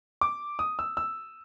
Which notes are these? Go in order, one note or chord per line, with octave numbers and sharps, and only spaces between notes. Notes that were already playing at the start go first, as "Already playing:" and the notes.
D6
D#6
E6
E6